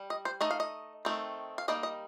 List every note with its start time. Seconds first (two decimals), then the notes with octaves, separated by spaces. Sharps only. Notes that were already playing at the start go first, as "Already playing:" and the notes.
Already playing: G3
0.10 D#5
0.25 C5
0.41 A3 D#4 D#5
0.51 F5
0.60 D#5
1.05 D#3 A3 C4
1.58 F5
1.68 G3 A#3 D#4 D#5
1.83 D#5